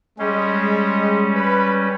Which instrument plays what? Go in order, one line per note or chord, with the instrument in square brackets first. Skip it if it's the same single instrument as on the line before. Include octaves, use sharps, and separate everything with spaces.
[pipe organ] G3 C#4 [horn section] G#3
[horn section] B4